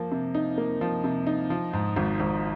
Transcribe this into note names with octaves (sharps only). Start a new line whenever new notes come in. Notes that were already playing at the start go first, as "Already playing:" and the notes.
Already playing: F3 A#3
C3
D#4
A#3
F3
C3
D#4
F3
G#2
G#1
G#1